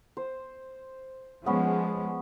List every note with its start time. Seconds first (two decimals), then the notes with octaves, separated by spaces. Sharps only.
0.17 C5
1.46 F3 G#3 B3 C#4